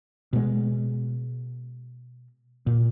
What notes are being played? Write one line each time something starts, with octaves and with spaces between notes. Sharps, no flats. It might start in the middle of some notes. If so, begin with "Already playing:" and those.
B2 G#3
A#2